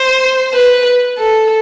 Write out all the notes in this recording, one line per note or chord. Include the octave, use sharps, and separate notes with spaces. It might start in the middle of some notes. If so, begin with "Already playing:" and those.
Already playing: C5
B4
A4